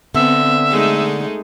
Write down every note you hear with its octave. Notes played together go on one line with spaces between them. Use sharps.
D3 B3 C4 E5
G#3 A3 D#4